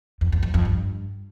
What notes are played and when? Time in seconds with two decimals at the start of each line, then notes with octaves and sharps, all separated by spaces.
0.21 F2
0.32 E2
0.43 F2
0.54 F2
0.65 G2